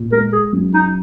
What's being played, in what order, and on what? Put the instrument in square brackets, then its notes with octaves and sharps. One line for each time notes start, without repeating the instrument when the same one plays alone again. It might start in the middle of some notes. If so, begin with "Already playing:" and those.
Already playing: [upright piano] A#2
[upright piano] G#3 [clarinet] A#4
[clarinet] G#4
[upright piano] F#2
[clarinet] D#4